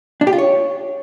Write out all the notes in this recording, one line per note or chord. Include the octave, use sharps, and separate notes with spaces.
D4
G4
F4
C#5